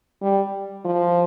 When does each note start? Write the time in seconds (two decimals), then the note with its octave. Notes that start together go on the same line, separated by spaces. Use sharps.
0.22 G3
0.85 F3